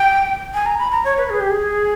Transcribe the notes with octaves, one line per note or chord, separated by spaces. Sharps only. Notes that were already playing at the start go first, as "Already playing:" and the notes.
Already playing: G5
G#5
A#5
B5
A#5
C#5
B4
G#4
G4
G#4